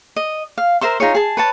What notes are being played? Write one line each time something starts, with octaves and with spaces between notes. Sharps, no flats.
D#5
F5
A#4 C5 E5 C6
D#4 F4 G#4 C#5
G#4 A5
B4 C#5 A5